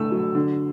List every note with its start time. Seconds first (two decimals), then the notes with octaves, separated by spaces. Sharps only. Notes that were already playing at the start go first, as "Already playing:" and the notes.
Already playing: D3 A3 E6
0.12 F#3
0.35 D3